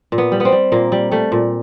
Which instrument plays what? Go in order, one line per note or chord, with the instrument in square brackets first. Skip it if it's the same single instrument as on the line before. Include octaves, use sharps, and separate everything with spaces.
[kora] A#2
B3
G3
B3 C4
G3
A#2 A#3
G3
G3 A3
A#2